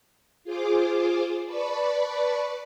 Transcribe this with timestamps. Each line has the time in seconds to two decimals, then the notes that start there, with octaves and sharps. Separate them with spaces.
0.44 F4 G#4 C5 D6
1.45 B4 D5 A5 B5 C#6